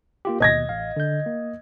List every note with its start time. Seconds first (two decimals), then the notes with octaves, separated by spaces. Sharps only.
0.25 A#3 F4 G4
0.40 D#2 B2 D#5 G#6 A#6
0.69 A1 F5
0.97 D3 G6
1.26 A#3